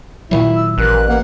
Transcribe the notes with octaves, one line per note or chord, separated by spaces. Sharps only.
A#2 D#3 F#3 E4
E6
A1 A#4 F#6
A#3 F#5